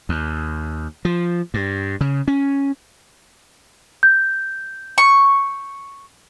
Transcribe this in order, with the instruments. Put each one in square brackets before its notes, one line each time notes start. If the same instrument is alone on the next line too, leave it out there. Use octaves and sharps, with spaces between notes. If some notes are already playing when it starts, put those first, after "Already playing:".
[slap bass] D#2
F3
G2
C#3
C#4
[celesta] G6
[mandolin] C#6